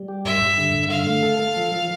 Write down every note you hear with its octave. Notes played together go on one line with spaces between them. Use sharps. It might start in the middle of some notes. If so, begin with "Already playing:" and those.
Already playing: G3
G4
G2 E5
G2
D3
G2
D3 F5
A3
A4
A4
F3
F3